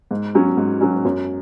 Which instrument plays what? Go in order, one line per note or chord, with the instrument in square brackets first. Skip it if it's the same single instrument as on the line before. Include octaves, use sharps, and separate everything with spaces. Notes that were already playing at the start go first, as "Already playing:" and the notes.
[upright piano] G#2
F#3 C#4
G#2
F#3 C#4
F#2